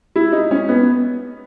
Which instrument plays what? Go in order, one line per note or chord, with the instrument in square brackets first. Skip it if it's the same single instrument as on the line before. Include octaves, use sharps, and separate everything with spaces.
[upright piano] E4
D#4
C#4
B3